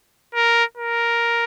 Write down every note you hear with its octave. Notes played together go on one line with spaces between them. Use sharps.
A#4
A#4